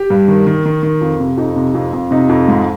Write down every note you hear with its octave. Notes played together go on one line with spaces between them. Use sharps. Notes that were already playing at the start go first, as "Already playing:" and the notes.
Already playing: G4
G2
D#3
D#3
D#3
D#3
F2
C3
F2 D#4
C3
F2
F2
C3 D#4
F2
G#2